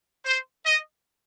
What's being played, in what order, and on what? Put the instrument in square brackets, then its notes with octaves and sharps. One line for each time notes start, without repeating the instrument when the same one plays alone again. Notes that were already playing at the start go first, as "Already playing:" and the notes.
[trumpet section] C5
D#5